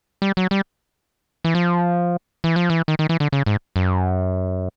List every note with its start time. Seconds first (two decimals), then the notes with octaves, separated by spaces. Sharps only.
0.22 G3
0.37 F#3
0.51 G3
1.44 E3
1.55 F3
2.44 E3
2.56 F3
2.70 E3
2.88 D#3
2.99 D#3
3.09 E3
3.20 D3
3.32 C#3
3.46 G#2
3.76 F#2